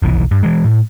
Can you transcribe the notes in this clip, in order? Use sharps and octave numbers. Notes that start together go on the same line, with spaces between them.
F1 B1 E3
G2
E3 G#3
A2